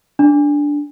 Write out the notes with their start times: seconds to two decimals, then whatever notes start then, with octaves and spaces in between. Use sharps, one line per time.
0.19 D4